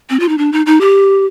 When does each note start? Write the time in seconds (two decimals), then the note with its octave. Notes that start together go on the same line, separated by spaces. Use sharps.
0.10 C4
0.20 F4
0.29 D#4
0.38 D4
0.53 D#4
0.66 D#4
0.81 G4